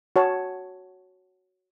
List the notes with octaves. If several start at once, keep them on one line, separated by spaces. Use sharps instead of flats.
F#4 C#5 A5